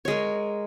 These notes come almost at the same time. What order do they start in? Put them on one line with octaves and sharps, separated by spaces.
C#5 G#3 A#4